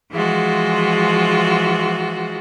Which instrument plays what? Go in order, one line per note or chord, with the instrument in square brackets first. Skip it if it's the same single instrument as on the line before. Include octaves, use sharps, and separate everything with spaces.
[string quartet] E3 F3 G#3 F4 F#4